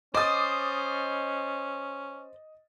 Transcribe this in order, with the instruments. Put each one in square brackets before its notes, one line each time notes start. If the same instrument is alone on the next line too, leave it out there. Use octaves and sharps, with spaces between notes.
[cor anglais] C#4 [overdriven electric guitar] C5 [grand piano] D#5 A6 [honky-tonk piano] D6 D#6